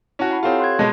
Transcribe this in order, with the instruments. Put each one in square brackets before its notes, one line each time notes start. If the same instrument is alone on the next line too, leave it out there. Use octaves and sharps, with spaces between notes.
[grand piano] C#4 F#4 [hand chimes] E4 A5
[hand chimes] F#5 B5
[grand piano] C4 F4 [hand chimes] G4 A4 C#5
[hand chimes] C6 F#6 G#6
[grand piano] B2 G#3 [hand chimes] A5